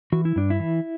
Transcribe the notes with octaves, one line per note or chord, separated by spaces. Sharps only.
E3 F#4
E4
G2 D4
E4
E3